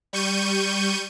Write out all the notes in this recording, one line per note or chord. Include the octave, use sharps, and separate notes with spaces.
G3 C#6 G6 D#7